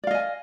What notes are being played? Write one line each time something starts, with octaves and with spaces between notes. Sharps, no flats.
D5 D#5 F5 G#5